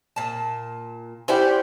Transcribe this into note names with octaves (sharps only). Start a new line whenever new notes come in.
A#2 A5
C#4 E4 G4 C5 D5 F#5